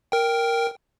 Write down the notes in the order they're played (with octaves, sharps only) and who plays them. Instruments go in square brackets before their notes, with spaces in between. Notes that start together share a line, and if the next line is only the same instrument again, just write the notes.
[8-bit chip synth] A#4 G5